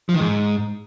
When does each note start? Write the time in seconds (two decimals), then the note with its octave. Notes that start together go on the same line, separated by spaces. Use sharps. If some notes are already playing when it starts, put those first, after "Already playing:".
0.09 F3
0.14 D#3
0.20 G#2